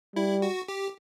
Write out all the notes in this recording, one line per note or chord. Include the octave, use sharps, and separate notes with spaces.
G3 E4
F#4
G4